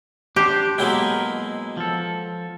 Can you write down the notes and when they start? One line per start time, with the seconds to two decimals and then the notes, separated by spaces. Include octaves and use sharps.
0.36 D4 G4 C5
0.78 B2 F#3 G#3 A#3 E4
1.77 F3 A4